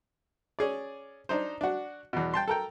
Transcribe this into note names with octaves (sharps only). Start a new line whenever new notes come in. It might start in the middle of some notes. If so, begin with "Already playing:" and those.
C#4 G#4 D5
D4 D#4 C5
D4 F#4
E2 B2
G5 A5 C6
A4 A#4 G5